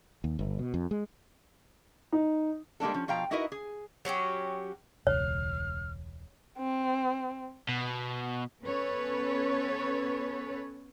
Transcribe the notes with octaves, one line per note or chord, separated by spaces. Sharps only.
D#2
G1
B2
F2
G#3
D#4
G3 G#3 A#3 D4 A4
F3 C#4
B2 F3 F5 G5 A#5
D#4 E4 F#4 A#4 B4 D#5
G#4
F#3 C#4 F#4 G4
E1 C#2 C#5 F6
C4
B2
B3 C#4 A4 B4 C#5